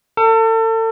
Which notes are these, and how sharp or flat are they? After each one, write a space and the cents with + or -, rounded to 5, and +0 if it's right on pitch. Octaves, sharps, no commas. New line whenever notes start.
A4 +35